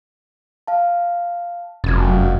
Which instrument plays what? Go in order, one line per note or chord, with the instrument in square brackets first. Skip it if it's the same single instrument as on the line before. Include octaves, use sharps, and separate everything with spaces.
[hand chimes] F5 A5
[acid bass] F1 [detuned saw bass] F#2 [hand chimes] G#6 A6